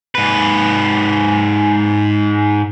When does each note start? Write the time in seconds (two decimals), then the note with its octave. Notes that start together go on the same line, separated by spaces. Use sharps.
0.15 G#2 B4